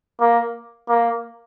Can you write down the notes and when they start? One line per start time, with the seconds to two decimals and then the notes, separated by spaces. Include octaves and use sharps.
0.21 A#3
0.89 A#3